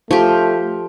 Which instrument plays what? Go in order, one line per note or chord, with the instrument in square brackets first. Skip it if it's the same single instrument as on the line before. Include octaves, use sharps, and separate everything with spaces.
[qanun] F3 G4 [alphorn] A3